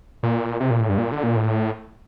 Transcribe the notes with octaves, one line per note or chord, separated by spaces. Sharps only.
A#2
C3
A#2
A2
G2
A#2
D3
A#2
A2